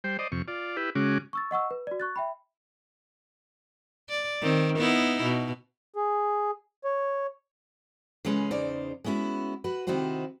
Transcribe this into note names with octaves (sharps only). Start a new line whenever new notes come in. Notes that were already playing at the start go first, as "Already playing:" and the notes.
G3 C5 G5
C5 D5 D#5
F2 C3 C#6
F4 D5
E4 G4 B4
C#3 G#3 C#4 F#4 D6
C#6 E6 A6
D#5 F#5 C#6 E6
B4
F#4 D5
C#6 F#6 A6
E5 G5 B5
D5
D#3 C4
B3 D#4 E4
B2
G#4
C#5
C#3 E3 G#3 C#4 B4
E2 C#3 D#4 C5 D5
G#3 B3 C#4 E4 F#4
F#4 B4
C3 D#3 D#4 E4 F#4 C5